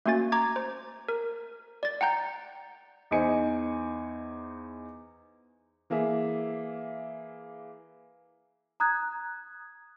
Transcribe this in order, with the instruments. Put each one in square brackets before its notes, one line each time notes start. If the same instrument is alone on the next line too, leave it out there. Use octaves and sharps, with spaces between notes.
[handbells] A3 A#3 C#4 F#4 G#5 A6
A#5 D6 G#6
C5
A#4
D5 A6
F#5 G5 A#5 G6
[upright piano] E2 D#4 C5 D#5 G#5 C#7
E3 A#3 G#4 E5
[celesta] A#5 D#6 F#6 G#6